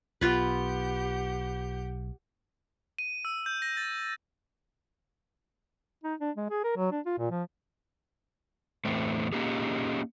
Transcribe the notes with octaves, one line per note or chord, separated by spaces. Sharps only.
B1 B3 F4 G4 B4 F#5 G6
D#7
E6
G6
A#6
A6
D#4
D4
G#3
G#4
A#4
F#3
D4
F4
A#2
F3
E2 A2 A3 C4
A#3 C#4 D#4 G4 G#4